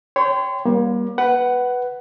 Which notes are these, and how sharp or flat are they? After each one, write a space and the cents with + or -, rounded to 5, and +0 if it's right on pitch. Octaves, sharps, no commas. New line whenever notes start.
C#5 +0 G5 +0 C6 -35
G3 +0 A#3 +35
B4 +0 F#5 +15